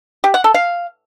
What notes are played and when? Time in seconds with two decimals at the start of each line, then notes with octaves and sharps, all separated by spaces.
0.24 G4
0.34 F#5
0.44 A4
0.54 F5